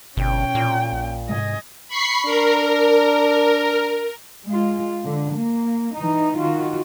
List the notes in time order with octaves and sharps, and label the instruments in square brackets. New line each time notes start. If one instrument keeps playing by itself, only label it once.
[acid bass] G1 [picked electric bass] B2 [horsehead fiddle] C#4 G5
[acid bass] A#2
[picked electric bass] A#1
[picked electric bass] G#2 C3 G#3 [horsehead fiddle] D#5 G#5
[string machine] B5 C#6 C7
[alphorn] D4 [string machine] A#4
[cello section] G#3 F4
D3
A#3
E3 D#4
D#3 F4 F#4